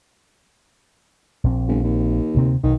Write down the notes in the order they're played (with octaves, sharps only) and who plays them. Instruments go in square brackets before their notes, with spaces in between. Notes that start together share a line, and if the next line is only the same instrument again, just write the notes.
[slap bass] A#1 C4
[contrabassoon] G1
D#2
[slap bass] D2 C3 C4
[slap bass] B1 [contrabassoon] D#3